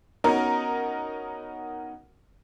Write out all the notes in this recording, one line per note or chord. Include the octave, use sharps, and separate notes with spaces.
B3 C#4 D#4 F#4 A#4